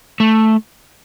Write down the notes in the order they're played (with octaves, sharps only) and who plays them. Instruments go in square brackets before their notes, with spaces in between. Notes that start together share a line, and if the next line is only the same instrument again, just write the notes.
[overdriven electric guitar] A3